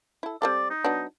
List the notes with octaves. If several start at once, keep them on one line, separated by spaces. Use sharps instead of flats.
E4 A4
G3 C4 A4 D5
D#4
F#3 B3 D4